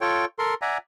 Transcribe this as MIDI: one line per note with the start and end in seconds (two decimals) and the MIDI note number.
0.01 0.25 65
0.01 0.25 69
0.01 0.25 73
0.01 0.25 79
0.39 0.54 69
0.39 0.54 70
0.39 0.54 84
0.62 0.78 74
0.62 0.78 76
0.62 0.78 78
0.62 0.78 80
0.62 0.78 82